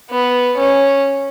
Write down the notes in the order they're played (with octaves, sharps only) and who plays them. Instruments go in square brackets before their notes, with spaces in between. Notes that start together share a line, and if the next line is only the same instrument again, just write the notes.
[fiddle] B3
C#4